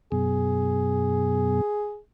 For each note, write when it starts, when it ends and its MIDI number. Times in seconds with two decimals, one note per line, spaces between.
0.12 1.61 42
0.12 1.61 47
0.12 1.98 68